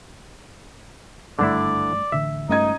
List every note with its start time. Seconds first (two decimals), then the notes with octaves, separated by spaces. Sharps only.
1.39 G#1 G2 D3 A3 D4 E4 D5
2.12 A1 D3 E5
2.49 C#2 G2 A3 D#4 D#5 G#6